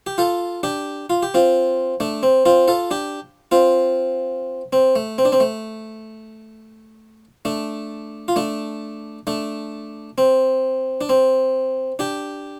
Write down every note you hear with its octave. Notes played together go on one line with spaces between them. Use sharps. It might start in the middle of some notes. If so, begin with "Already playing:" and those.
G4
F4 A4
D4 G4
F4
G4
C4 F4
A3 D4
C4
C4 F4
F4 A4
D4 G4
C4 F4
C4
A3
C4
D4
C4
A3
A3 D4
F4
A3 D4
A3 D4
C4
D4
C4
D4 G4